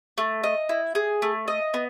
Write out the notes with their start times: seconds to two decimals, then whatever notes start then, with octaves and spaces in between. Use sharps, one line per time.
0.18 A3
0.44 D#5
0.69 E4
0.95 G#4
1.22 A3
1.48 D#5
1.74 B3